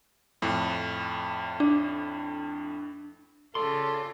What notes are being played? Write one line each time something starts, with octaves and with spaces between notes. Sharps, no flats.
F2 A2
D4
C#3 F4 A4 D5 C6